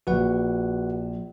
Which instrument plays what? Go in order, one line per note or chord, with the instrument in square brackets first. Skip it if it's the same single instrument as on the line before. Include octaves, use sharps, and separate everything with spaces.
[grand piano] A#1 [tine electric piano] F#4 B4 F#5